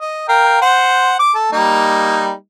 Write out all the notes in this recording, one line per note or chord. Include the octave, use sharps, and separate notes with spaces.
D#5
A#4 F5 G5
C5 F#5
D6
A4
G3 A#3 D#4